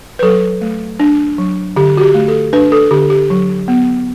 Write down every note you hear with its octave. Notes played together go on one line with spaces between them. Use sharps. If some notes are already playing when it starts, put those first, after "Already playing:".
B4
F#3 A4
A3
D4
F#3
D3 G4
F#4
G4
A3
A4
D4 B4
A4
D3 G4
G4
F#3
B3